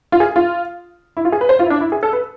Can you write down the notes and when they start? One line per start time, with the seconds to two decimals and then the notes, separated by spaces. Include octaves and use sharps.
0.12 F4
0.20 G#4
0.36 F4
1.17 E4
1.25 F4
1.32 G#4
1.41 B4
1.49 C5
1.59 F4
1.66 E4
1.70 D4
1.81 E4
1.92 G#4
2.03 A4
2.13 B4